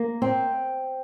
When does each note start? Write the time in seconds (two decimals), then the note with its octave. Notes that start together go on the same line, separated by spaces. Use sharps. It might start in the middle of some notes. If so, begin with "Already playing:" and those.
Already playing: A#3
0.22 C4